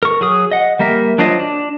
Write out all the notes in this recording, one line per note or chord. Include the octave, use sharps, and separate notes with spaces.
A#4 C#6
F#3 G#4 D#6
D#5 F#5
G3 A#3 A#4 E5
F#3 D4 F4 C5 D#5
D4